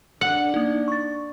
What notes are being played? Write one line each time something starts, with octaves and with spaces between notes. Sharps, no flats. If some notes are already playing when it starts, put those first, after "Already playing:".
D4 F#5
A#3 D#4
C#6 A6